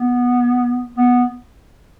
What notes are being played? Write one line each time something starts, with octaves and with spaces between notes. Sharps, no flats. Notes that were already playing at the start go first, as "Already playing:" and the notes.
Already playing: B3
B3